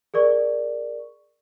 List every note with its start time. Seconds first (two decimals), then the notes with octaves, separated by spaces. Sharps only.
0.14 G#4 A#4 D5 C#6